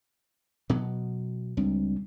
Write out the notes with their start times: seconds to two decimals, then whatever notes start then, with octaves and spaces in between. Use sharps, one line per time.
0.70 B2 F#3 B3
1.57 C#2 G3 C4 D4